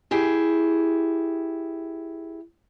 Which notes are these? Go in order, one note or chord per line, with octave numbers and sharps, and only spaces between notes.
E4 G4 G#4